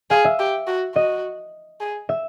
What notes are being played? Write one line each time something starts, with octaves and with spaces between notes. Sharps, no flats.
G#4 F5
E5
G4
F#4
F#4 D#5
G#4
E5